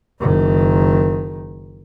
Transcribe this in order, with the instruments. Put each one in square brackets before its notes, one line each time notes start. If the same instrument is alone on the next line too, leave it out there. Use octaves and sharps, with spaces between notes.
[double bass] F#1 D#3